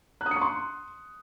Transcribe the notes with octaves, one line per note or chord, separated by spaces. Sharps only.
F#6
D#6
C#7
C#6
C6